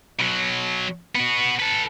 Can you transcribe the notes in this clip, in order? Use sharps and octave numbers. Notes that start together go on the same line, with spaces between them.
B2 F#3
B3 F#4
A4 B4